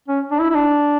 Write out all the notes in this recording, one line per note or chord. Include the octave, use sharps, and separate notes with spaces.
C#4
D4
E4
E4
D4